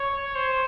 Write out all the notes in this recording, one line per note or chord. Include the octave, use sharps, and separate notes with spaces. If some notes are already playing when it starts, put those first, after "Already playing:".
Already playing: C#5
C5